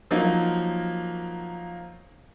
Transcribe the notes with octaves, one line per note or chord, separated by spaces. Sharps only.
F3 F#3 A#3 D#4